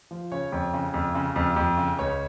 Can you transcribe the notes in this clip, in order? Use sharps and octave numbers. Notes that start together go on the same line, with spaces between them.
F3
C#3 C#5
F2
C#3
F2
C#3
F2
F2
C#3
C#2 C#5